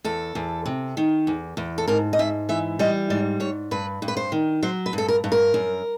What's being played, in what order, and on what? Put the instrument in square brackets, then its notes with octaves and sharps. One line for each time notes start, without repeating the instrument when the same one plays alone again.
[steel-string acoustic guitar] E2 A4
E2
C3
D#3
E2
E2
A4
G#2 A#4
D#5
G#2 E5
E3 E5
G3 D#5
G#2 D5
G#2 C#5
G2 B4
G2
B4
C5
D#3
F#3 C5
B4
G2 A4
A#4
G2
A#4
F#2